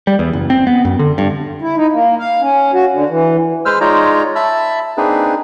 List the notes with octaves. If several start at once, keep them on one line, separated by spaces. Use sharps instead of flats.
G3
E2
F#1
C4
B3
F#2
D3
G2
E4
D#4
A#3
F5
C#4
F#4
D3
E3
G#3 B4 C5 E6 F6
G#3 D#4 F4 C#5 D5 A#5
E5 A5 B5 E6
A#3 C4 D4 D#4 G#4 B4